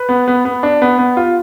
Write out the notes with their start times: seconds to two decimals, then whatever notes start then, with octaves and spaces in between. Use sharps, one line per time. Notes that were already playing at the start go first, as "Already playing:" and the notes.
Already playing: B4
0.09 B3
0.28 B3
0.45 B3
0.63 D4
0.82 B3
0.99 B3
1.17 F4